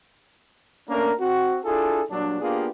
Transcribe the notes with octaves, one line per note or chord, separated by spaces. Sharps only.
A3 A#3 C#4 D4 A#4
C4 F#4
D4 E4 F4 G#4 A4
A#2 F#3 G3 D4
A#3 B3 D4 F4 G4 G#4